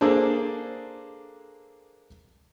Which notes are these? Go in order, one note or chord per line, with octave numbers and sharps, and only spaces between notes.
A#3 D4 G#4 A4 C5